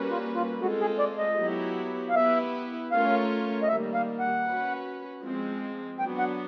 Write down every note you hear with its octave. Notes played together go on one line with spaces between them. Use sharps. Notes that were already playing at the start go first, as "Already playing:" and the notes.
Already playing: G3 A#3 C#4 F#4 B4
F4
F4
G#3 C4 F4 F#4 A4
G#4
D5
D#5
F#3 B3 E4 G4
F5
B3 E4 G4 B4 E5
A3 C#4 F4 A#4 C#5 F5
D#5
D#3 G3 A#3 E5
F5
F#5
C#4 F#4 B4
F3 G#3 C4
F#3 B3 D4 F#4 G5
F#5